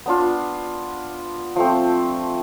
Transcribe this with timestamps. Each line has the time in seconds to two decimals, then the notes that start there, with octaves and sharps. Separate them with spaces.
0.06 B3 D4 F4
1.56 F3 A3 C4